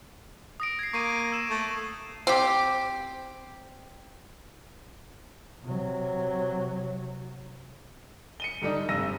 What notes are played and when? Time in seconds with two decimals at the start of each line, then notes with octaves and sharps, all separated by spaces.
0.60 D#6 A#6 D7
0.79 G#6 C7
0.93 A#3 C#6 C7 D#7
1.32 E6 E7
1.50 A3
2.27 C4 G4
5.64 C3 F#3
8.40 C#7 D#7 G7
8.61 G#2 D3 G3 D4 D#4
8.88 F1 G2 D3 E6 A#6 D#7